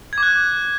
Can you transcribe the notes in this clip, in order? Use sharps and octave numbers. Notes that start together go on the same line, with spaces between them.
D6 F#6 G#6